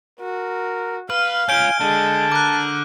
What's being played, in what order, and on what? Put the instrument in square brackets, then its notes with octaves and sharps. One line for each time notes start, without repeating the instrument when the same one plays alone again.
[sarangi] F#4 [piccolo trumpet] A#4
[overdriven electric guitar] B4 [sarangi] F5 [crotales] F6
[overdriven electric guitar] C#4 F4 [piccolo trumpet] G#5 [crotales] G6 D7 G7
[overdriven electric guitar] D3 [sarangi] G#3 [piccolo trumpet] A5
[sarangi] A#4 [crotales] D6 F#6